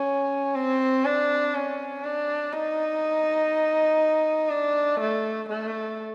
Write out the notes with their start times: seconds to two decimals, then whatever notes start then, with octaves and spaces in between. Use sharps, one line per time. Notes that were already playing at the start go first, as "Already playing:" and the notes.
Already playing: C#4
0.55 C4
1.05 D4
1.54 C#4
2.04 D4
2.53 D#4
4.50 D4
5.00 A3
5.49 A3